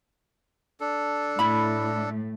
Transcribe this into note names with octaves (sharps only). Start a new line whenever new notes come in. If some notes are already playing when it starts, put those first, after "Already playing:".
D4 A4
A2 A3 E4 B5